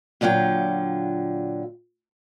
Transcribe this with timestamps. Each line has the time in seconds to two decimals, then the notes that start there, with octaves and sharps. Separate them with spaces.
0.21 A#2 D3 F#3 F4 G5